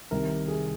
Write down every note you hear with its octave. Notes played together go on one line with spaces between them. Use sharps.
C2 C3 D#3 A#4
G#4